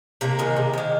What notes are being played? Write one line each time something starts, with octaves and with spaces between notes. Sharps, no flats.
C3 A#3
D#3 G#3
C3
D#3 G#3